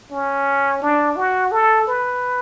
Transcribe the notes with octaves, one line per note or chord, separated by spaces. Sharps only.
C#4
D4
F#4
A4
B4